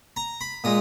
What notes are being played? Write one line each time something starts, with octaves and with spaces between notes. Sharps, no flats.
A#5
B5
A#2 G#3 D#6